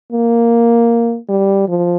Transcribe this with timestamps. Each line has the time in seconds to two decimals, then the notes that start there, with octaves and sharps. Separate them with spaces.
0.13 A#3
1.29 G3
1.68 F3